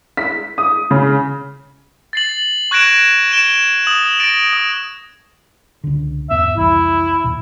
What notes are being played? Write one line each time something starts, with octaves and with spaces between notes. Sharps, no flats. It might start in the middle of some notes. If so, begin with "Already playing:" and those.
B6
D#6
C#3
A6 C7 F#7
C#6 F#6 G#6 A#6 D7 E7
D7 E7 G7
D#6 A6 F#7
A6 A#6 D7
D#6
C#2 D3
E2 G#2 B3 E5
C2 F2 E3 E4
D#2 B2